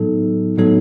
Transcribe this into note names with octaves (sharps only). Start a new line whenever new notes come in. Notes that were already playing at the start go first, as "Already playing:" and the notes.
Already playing: A2 F#3 B3 D#4 A4
A2 F#3 B3 D#4 A4